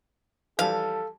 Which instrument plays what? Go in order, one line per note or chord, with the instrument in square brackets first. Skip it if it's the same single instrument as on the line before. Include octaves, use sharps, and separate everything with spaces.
[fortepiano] E3 F3 G3 [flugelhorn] A4 [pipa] F5